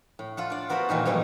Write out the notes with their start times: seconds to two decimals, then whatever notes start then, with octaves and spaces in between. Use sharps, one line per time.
0.19 A2
0.37 F4 A4 F#5
0.50 D4 D5
0.69 B3 F#4 A#4 C5 B5
0.89 A#2 D#3 E3 D#4
1.05 G#2 B2 F3 G3 A3 D#4